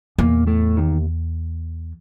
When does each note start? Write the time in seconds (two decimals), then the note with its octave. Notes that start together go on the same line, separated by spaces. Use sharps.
0.19 E2 A#2 A#3
0.47 A2 A3
0.77 D#2 D#3